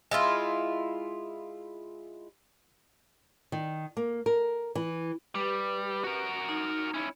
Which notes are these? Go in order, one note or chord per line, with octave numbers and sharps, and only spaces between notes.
G#3 E4 F4
D#3
A#3
A#4
E3
G3 G4 B4
F#4 A#4
D#4
C#4 E4